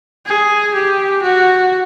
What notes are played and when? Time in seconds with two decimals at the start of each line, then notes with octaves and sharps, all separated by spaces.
0.26 G#4
0.74 G4
1.22 F#4